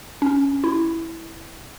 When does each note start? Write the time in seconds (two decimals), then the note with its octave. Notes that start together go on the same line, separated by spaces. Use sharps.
0.22 C#4
0.64 E4